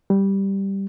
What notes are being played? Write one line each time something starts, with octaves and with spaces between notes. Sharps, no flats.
G3